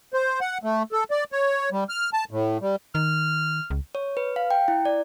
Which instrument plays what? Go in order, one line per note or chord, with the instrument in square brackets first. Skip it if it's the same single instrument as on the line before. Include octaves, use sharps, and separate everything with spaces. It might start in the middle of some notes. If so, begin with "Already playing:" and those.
[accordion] C5
F#5
A3
A4
D5
C#5
G3
F6
A5
A2
G3
[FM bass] D#3 [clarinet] F6
[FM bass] C#2
[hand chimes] C#5
B4
F5
G5
E4
D5